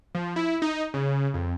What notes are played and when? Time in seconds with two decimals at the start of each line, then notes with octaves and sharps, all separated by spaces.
0.15 F3
0.36 E4
0.62 D#4
0.94 C#3
1.34 F2